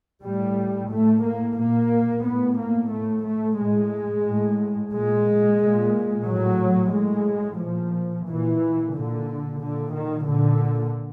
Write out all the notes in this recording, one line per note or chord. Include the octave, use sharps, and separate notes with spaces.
A2 G3
A2 A3
A#3
A#2 A#3
A2 B3
A#3
A2 A3
A3
A2 G#3
A2
A#2 G#3
A#2
A2 F#3
A2 G#3
A#2 F3
A#2 E3
A#2 D3
A#2 D3
D#3
A#2 D3